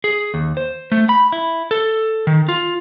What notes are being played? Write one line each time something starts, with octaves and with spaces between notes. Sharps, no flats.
G#4
D#2
C5
A3
B5
E4
A4
D#3
F4